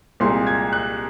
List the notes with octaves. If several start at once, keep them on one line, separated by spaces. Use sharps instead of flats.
C2 A#2 G#3 C6
G#6
F#6